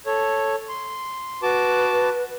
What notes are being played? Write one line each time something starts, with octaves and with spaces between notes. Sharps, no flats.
A4 C#5
C6
F#4 B4 A5 D6